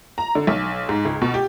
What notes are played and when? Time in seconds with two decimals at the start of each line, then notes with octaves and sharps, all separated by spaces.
0.18 A#5
0.35 D3
0.47 B1
0.89 G#2
1.05 C#2
1.22 B2
1.34 G4